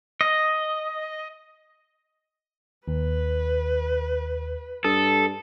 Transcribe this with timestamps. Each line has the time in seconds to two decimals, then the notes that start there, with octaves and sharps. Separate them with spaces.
0.21 D#5
2.88 D#2 B4
4.84 G2 A4 D#6